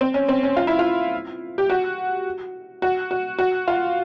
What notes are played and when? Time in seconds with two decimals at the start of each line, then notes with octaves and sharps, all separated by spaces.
0.01 C4
0.14 C#4
0.29 C4
0.43 C#4
0.57 F4
0.67 E4
0.79 F4
1.58 G4
1.70 F#4
2.82 F#4
3.11 F#4
3.39 F#4
3.68 F4